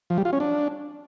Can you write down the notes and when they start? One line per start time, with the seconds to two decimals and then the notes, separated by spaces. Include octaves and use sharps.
0.10 F3
0.18 G3
0.25 F4
0.33 C#4
0.40 D4